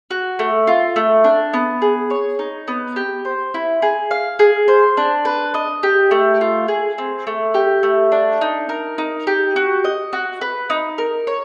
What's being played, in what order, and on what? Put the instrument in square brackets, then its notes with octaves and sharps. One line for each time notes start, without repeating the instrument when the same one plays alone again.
[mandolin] F#4
A3
F4
A3
D4
B3
G#4
C#5
D#4
B3
G4
C5
E4
G#4
F5
G#4
C5
D4
B4
D#5
G4
A3
F4
G#4
C4
A3
G4
A3
D4
D#4
A#4
D#4
G4
F#4
D#5
F#4
B4
D#4
A#4
C#5